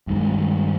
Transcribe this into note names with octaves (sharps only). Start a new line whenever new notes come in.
G2 D#3 G#3